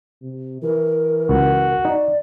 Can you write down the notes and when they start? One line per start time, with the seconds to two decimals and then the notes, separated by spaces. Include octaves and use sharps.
0.22 C3
0.62 E3 A#4
1.29 C#2 F#4
1.85 D#4 D5